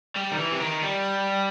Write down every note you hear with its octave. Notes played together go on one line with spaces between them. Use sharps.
G3
D#3
E3
C3
D#3
G3